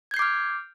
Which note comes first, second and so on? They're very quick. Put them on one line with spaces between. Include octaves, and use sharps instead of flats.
G#6 G6 C7 D6 F6